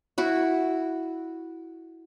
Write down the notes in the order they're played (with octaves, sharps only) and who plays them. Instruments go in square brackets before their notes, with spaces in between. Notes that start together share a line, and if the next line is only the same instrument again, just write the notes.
[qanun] E4 F#4